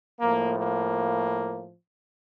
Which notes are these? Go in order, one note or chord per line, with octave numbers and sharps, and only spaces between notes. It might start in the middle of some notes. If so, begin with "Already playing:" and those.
A2 F3 A#3
A#3